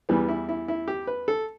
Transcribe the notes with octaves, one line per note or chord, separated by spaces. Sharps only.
E2 E3 G3 B3
E4
E4
E4
G4
B4
A4